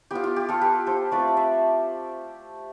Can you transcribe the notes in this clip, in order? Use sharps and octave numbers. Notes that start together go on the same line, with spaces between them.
B3 F4 G4
F4
G4
F4 A4
G4 B4
A4 C5
A3 C4 F4 B4 D5
D5
C5 E5